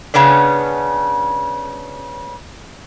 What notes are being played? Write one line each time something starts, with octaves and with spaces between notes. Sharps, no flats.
C#3 B3 C#4 D4